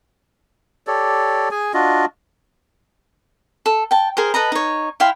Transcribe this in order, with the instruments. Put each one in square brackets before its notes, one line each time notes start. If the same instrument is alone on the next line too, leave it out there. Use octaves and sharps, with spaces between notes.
[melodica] G4 A4 C#5 D5
G#4 G#5
D4 F4 F#4 D#5
[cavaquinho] A4
G5 A5
G#4 A#4 C5
A4 B4 D#5 A#5
D#4 C#5
E4 F5 G5 C6